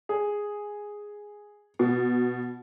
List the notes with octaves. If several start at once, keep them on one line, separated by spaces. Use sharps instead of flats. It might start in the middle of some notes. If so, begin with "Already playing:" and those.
G#4
B2